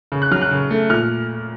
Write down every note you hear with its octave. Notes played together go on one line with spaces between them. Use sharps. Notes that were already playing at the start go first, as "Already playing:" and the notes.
C#3
F#6
F#3 F6
F#6
C#3
A3
A#2 F6